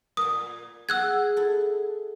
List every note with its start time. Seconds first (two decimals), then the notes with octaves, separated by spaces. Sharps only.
0.17 A#2 A#4 G#5 D#6
0.89 F#4 G#4 E6 F#6 G#6
1.37 E4 A4